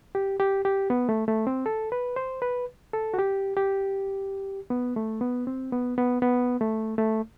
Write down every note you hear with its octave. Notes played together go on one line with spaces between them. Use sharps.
G4
G4
G4
B3
A3
A3
C4
A4
B4
C5
B4
A4
F#4
G4
G4
B3
A3
B3
C4
B3
B3
B3
A3
A3